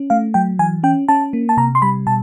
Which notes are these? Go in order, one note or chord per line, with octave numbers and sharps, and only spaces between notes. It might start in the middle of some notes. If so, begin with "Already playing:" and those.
Already playing: C#4
A3 F5
F#3 G5
E3 G#5
C#4 G5
C#4 A5
A#3
A5
C3 A#5
C6
G3 B5
B2 A5